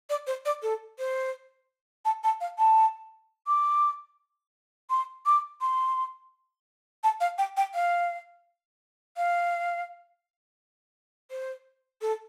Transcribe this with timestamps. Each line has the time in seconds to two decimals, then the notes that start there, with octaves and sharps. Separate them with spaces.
0.10 D5
0.27 C5
0.46 D5
0.63 A4
0.99 C5
2.05 A5
2.24 A5
2.41 F5
2.59 A5
3.47 D6
4.90 C6
5.26 D6
5.61 C6
7.04 A5
7.20 F5
7.38 G5
7.57 G5
7.74 F5
9.17 F5
11.31 C5
12.02 A4